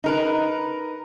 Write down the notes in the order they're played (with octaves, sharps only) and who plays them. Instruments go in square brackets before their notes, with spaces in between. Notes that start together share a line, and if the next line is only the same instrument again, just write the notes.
[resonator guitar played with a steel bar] D#4 A#4 B4